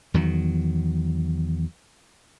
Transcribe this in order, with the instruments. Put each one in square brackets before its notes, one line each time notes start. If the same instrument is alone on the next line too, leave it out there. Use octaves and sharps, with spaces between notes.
[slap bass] E2 D#3 F#3